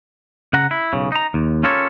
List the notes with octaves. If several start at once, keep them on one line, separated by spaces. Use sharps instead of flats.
C#3 F#5 A#5
E4
B1 C#3
D#4 A#5
D#2
C#4 F4 G4 A4 A#4 C#5